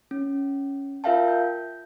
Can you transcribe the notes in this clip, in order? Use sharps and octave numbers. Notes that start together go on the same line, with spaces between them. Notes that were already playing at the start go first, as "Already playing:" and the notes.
C#4
F4 A#4 E5 F5 G5 A5
G6